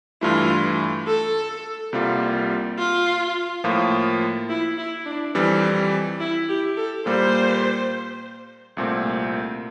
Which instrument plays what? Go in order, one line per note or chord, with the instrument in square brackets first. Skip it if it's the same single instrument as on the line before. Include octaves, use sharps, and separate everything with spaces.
[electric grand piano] G2 E3 A3 E4 [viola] F4
[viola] A4
[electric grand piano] C2 C3 G3 A#3 F4
[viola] F4
[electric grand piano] A2 F3 A#3 F4
[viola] E4
E4
D4
[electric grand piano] F2 E3 G3 [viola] C4
[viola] E4
G4
A4
[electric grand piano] A#2 G3 A#3 [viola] C5
[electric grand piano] C2 A#2 A3 C4